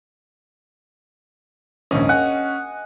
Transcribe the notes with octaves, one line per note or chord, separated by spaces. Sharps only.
A#1 D#2 G#2 C#4 D#5
F#5 G#5